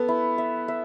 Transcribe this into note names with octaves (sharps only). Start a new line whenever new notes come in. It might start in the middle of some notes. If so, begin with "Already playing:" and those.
Already playing: B3 A4
E4
E5
E5